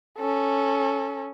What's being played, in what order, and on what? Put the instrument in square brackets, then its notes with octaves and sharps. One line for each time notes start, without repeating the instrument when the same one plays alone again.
[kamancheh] C#4 A4